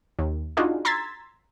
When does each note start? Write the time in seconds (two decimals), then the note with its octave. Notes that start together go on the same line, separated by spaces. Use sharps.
0.19 D#2
0.57 D4 D#4 F4 F#4 G#4
0.85 A#5 C6 E6 G#6 A6 B6